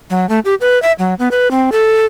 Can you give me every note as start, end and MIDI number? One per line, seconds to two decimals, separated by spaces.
0.10 0.28 54
0.29 0.39 57
0.45 0.55 67
0.61 0.81 71
0.82 0.92 76
0.99 1.14 54
1.19 1.29 59
1.31 1.51 71
1.51 1.70 60
1.72 2.05 69